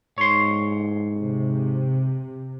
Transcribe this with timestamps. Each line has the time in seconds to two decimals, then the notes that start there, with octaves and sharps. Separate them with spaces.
0.18 G#2 C#5 C6
1.16 C3